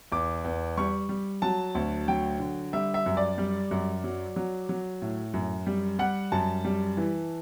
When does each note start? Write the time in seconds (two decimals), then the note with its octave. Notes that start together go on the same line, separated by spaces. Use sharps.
0.12 E2 D6
0.44 E2
0.77 G3 C#6
1.09 G3
1.42 F#3 A5
1.75 D2
2.08 F#3 G5
2.40 D3
2.73 G3 E5
2.94 E5
3.06 F#2
3.17 D5
3.38 G3
3.71 F#2
4.04 F#3
4.36 F#3
4.69 F#3
5.02 A2
5.34 F#2
5.67 G3
5.99 G3 F#5
6.32 F#2 A5
6.65 G3
6.97 E3